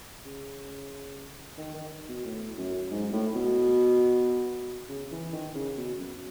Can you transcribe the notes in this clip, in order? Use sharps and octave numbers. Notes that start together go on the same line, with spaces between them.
C#3
D#3
D#3
B2
A2
F#2
G#2
A2
B2
C#3
E3
D#3
C#3
B2
F#2